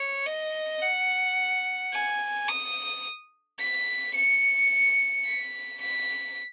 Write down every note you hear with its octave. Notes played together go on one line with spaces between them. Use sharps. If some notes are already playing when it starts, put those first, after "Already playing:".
Already playing: C#5
D#5
F#5
G#5
D#6
B6
C#7
B6
B6